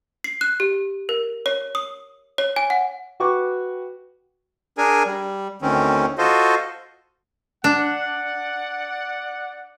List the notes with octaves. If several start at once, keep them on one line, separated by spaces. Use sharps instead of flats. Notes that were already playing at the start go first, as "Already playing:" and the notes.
C7
F#6
G4
A#4
C#5
D#6
C#5
G#5
F#5
F#4 B4 G5 C#6 D6
D4 G#4 A#4 G#5
G3
D2 D#3 C4 C#4
F4 F#4 A4 C5 D#5
D4 D5 F#5